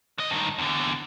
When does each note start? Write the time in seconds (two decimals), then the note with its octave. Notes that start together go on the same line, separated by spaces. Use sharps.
0.18 D3 D#5
0.30 G2 D#3
0.58 E2 D3